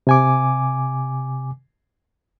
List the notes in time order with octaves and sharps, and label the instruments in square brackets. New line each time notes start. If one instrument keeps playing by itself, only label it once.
[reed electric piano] C3 G#5 D6